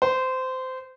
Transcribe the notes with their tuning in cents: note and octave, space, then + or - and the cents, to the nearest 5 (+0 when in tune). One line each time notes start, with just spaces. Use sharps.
C5 -20